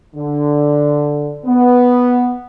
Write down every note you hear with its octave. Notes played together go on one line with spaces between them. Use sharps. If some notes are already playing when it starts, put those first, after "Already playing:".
D3
B3